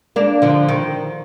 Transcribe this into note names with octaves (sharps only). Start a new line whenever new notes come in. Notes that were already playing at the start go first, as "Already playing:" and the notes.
A#3 D4
D3 F3
D#3